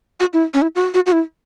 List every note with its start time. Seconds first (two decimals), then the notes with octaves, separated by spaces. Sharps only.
0.20 F#4
0.33 E4
0.54 C#4
0.62 E4
0.75 F#4
0.94 F#4
1.06 F#4
1.12 E4